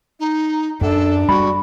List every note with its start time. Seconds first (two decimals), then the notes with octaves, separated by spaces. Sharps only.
0.19 D#4
0.81 F#2 D4 A4
1.29 G3 F#4 B5